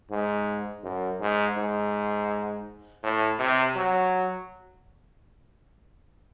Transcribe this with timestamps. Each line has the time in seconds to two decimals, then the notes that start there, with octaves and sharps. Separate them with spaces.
0.11 G#2
0.84 F#2
1.20 G#2
1.57 G#2
3.03 A2
3.39 C3
3.76 F#3